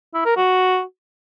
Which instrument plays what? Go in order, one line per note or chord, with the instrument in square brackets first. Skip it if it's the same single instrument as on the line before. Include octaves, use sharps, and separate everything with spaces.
[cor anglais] E4
A#4
F#4